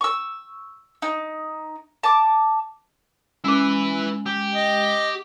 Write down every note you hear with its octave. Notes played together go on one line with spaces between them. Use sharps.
C#6 E6
D#4
A5 D6
G#3 C#4 E4 B4 D6
G4
D#5